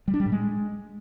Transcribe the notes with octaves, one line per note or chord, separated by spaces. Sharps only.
G3
D4
G3
A2
G#3